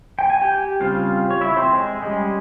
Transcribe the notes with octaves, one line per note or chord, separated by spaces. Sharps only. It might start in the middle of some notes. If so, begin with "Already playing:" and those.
G5
G#5
G4 G5
C#3 G3 C4 F4 F5
C#5
E4 E5
C4 C5
G#3 G#4
G3 G#3 C#4 G#4